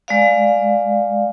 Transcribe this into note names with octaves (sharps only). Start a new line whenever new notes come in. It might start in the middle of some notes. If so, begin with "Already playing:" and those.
G#3 D5 F5